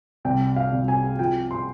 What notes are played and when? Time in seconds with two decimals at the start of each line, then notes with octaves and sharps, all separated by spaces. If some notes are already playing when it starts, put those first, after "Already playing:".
0.25 C2 G5
0.56 F5
0.72 C2
0.88 G#5
1.19 F3 G5
1.51 C6